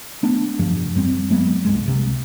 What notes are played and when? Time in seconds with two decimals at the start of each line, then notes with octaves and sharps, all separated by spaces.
0.23 A3 B3 D4
0.59 F1 G2 F3
0.95 F#2 G3 C4
1.30 F#3 G#3 A#3 B3
1.65 C2 G2 G#3
1.86 C2 C3